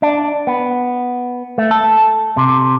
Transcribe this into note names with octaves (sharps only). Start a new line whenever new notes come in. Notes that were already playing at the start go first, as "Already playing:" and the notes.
D4
B3
A3
A4
C3